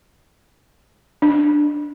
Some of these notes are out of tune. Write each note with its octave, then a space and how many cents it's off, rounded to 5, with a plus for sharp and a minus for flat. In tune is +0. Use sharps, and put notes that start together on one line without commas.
D4 +0